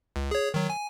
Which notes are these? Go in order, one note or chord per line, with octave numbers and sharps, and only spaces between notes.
C#2
G#4 C#5
D#3 F#3
G#5